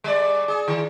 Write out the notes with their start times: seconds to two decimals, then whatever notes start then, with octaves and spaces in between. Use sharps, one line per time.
0.04 G3 D5
0.48 G#4
0.68 D#3